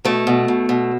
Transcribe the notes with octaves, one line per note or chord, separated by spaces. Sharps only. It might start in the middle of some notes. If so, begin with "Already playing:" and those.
B2 A3
B2
B2
B2